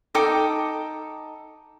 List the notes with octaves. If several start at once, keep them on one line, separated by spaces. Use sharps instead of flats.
D#4 A4 G5 D6